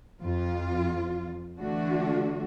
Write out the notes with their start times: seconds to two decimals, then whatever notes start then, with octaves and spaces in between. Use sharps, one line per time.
0.21 F2 F4
1.58 D3 E3 A3 D4 F#4